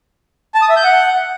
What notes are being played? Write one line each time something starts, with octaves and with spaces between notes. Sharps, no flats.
A5
D#6
E5
G6
F#5